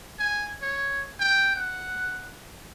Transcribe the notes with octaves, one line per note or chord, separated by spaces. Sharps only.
G#5
C#5
G5
F#5